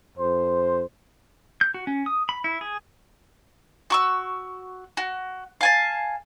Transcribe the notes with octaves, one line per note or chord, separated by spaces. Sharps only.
F2 C5
G6
F#4
C#4
D#6
B5
E4
G#4
F#4 C#6 E6
F#4
F5 G#5 A5